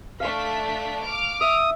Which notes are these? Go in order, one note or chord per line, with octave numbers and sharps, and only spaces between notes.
A3 D4 F5 C#6 B6
D6 F6
E5 D#6